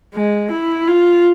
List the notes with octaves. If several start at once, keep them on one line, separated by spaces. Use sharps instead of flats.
G#3
E4
F4